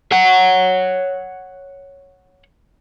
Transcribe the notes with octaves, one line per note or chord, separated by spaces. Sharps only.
C#5 F#5